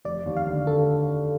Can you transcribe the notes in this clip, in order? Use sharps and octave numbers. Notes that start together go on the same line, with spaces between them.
F1 D5
D#2
F5
D3
D3 A4